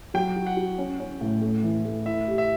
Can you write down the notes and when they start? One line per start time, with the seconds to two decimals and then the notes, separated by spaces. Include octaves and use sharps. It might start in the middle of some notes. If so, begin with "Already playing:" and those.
0.14 F#3 G5
0.36 F#4
0.47 F#5
0.57 F#4
0.78 C#4
1.00 C#4
1.21 A2
1.41 A3
1.63 E3
1.85 A3
2.05 E4 E5
2.28 G4
2.38 E5